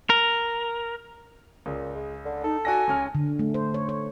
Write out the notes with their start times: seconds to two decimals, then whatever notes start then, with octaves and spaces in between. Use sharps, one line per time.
0.10 A#4
1.66 C#2 A#2 C#3
1.95 G#3
2.25 D3
2.44 D#4 A4
2.65 F#4 D5 G#5 A#6
2.88 C#2 C#4 F6
3.15 D3
3.39 A3
3.54 C5
3.74 C#5
3.89 C#5